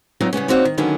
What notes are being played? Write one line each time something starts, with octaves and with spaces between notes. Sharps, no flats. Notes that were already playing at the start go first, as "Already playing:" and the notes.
F#3 B3 C4 D#4 F4
C#3 G3 B3 C#4
A#3 C4 D#4 F#4 C#5 D5
D#3
D3 D#3 F#3 A#3 B3 C#4